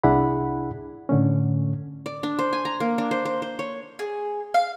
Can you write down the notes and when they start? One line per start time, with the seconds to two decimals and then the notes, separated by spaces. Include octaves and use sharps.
0.03 C2 D4 E4 G#4 F#5 B5
1.09 A2 D3 A3 C#4
2.06 D5
2.23 D4
2.39 C5
2.53 G#5
2.65 A#5
2.80 A#3
2.98 D4
3.11 C5
3.25 C5
3.42 C5
3.59 C#5
3.99 G#4
4.54 F5